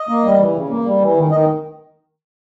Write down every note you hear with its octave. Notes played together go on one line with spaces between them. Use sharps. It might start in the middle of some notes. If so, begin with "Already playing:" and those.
Already playing: D#5
A#3
G3
E3
C#3
A#3
G3
E3
D#3
D#3 D#5